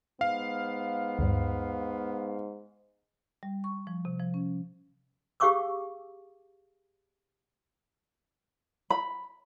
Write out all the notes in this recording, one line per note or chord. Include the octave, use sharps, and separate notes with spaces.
G#2 B3 F5
D2 G2
G3
C#6
F3
C3
F3
C#4
G4 G#4 F5 C#6 D6 E6
B5